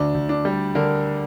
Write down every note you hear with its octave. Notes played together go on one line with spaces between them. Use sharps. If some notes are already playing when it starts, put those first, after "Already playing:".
Already playing: D2 D4
D2
D4
G3
D3 A#4